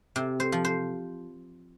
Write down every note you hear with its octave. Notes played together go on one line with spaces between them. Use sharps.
C3
C5
F3
C5